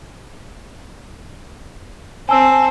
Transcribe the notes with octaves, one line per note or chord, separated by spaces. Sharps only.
C4 G#5 A5 E6